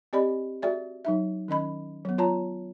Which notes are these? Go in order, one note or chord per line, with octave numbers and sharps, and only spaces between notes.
C4 G4 D5 D#5 B5
F#4 G#4 D5 E5
F#3 D#4 E5
D#3 C#4 D#5 B5
F#3 B3
F4 C#5 A5 A#5